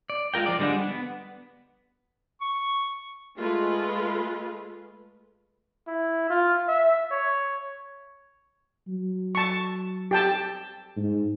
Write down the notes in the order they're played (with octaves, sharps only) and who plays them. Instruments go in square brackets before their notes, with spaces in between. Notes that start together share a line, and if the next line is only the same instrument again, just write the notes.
[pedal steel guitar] D5
G#3 F4 A#4 G5
F3 D5
D3 G3 G#3 D4 F#5
B3
[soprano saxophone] C#6
[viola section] G#3 A3 F4 B4
[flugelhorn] E4
F4
E5
C#5
[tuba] F#3
[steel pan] A5 C#6
G4 G5 A5
[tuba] G#2